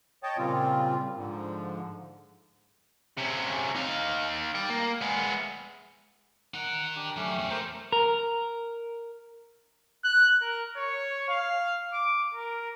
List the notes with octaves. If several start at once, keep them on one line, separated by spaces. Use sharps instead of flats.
C#5 D#5 G5 A5
A#2 C#3 G3 C4 F4
G#2 D3 F3
C3 C#4
D#4 F5
D5 G5
A#3
G#3 B3
D#4 A#4 F#5
D4 G4
F#2 A3 C#4 G4
E2
A3 A#4 C5 D6
A#4
F#6
A#4
C#5
F5
D6
A#4